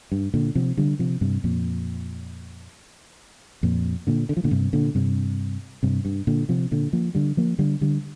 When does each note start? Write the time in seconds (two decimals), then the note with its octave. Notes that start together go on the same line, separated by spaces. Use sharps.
0.12 G2
0.34 A#2 D3
0.55 C3 F3
0.77 D3 G3
0.99 C3 F3
1.21 G2 C3
1.44 F2 A#2
3.63 F2 A#2
4.07 A#2 D3
4.29 D3
4.37 F3
4.44 A#2 D3
4.51 G2 C3
4.73 A#2 D3
4.95 G2 C3
5.83 G2 C3
6.05 G2
6.27 A#2 D3
6.49 C3 F3
6.71 A#2 D3
6.93 F3 A#3
7.15 D3 G3
7.37 F3 A#3
7.59 D3 G3
7.81 D3 G3